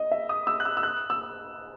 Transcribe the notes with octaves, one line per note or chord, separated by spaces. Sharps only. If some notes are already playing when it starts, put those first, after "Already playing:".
Already playing: D#5
E5
D#6
E6
F#6
E6
E6
F#6
E6